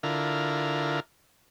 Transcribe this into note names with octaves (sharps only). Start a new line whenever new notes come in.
D3 E4 F4 A#4